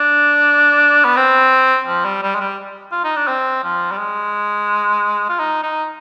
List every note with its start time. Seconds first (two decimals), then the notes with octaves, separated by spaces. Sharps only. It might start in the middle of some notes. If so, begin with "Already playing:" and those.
Already playing: D4
1.05 B3
1.17 C4
1.87 F3
2.05 G3
2.23 G3
2.35 G#3
2.41 G3
2.92 F4
3.04 D#4
3.16 D4
3.28 C4
3.64 F3
3.92 G3
3.98 G#3
5.29 F4
5.39 D#4
5.63 D#4